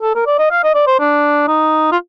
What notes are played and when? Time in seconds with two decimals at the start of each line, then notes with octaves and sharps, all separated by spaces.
0.02 A4
0.15 A#4
0.26 D5
0.39 D#5
0.51 F5
0.64 D#5
0.75 D5
0.87 C5
0.99 D4
1.48 D#4
1.92 F4